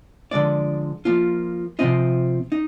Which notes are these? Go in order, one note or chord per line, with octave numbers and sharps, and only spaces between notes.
D3 F3 G#3 D5
F3 A#3 F4
C3 F3 C4 F4 D#5
D#4